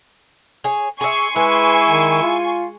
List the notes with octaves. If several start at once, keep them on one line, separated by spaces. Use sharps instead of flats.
G#4 C#5
G#4 E5 G#5 C6 C#6
G#3 E4 B4
D#3
F4